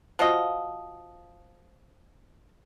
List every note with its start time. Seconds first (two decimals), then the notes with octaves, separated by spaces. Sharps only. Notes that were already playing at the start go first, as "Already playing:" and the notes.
0.19 F3 F4 F#4 D#5